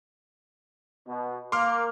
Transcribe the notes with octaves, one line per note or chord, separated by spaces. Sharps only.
B2
A#3 C6 D6 F6